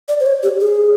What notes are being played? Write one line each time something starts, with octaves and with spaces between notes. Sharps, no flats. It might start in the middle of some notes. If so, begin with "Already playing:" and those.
D5
C5
C#5
G4
G#4